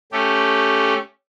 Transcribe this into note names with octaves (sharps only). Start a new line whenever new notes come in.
A3 C#4 G4